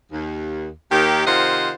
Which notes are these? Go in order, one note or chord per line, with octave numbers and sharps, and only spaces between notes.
D#2
D#2 D#3 G4
C3 D#3 F4 C5 D#5 F#5